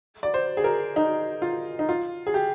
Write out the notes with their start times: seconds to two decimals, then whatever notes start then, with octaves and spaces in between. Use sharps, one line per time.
0.23 D5
0.34 C5
0.57 G#4
0.64 A#4
0.96 D#4
1.42 F4
1.79 D#4
1.89 F4
2.27 G#4
2.34 G4